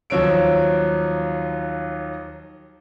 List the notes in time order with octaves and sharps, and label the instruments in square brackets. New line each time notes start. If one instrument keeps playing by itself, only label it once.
[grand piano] D#2 F3 F#3 C#5 E6 D7